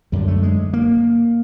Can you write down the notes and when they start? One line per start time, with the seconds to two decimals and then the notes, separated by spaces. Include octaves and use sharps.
0.12 F#2 D3 G3
0.28 A3
0.43 G#3
0.73 A#3